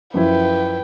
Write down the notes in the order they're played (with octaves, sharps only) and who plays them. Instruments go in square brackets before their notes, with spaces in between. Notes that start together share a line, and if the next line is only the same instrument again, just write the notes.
[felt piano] F#2 F3 E4 [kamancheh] B4 G5